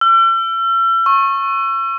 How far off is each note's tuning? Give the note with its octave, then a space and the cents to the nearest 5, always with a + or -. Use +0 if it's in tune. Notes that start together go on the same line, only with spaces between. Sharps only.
E6 +40
C#6 -20